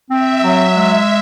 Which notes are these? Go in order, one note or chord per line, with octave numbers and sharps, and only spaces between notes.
C4 E5
F#3
G#3